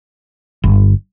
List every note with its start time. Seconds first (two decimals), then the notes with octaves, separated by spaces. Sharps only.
0.64 G1